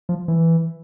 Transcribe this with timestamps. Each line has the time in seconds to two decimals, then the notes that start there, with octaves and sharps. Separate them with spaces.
0.09 F3
0.28 E3